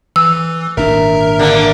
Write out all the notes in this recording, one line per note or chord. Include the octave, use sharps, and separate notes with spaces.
E3 E6
G#1 A#2 D4 A#4 E5 A#5
D3 A#3